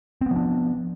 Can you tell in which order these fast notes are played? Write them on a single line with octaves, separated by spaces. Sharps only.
C4 B3 F3 D4